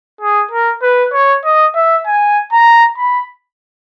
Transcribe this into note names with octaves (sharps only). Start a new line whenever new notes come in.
G#4
A#4
B4
C#5
D#5
E5
G#5
A#5
B5